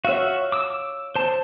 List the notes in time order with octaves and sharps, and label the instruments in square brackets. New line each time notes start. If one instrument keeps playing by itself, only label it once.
[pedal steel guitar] F#4 E5 [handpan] C#5 F5
[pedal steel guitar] D6 E6
C5 A5